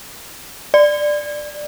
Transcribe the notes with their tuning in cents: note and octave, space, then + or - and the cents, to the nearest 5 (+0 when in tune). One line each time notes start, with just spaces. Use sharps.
D5 +10